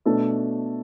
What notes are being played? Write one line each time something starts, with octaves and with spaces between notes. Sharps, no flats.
B2 A3 D4 A4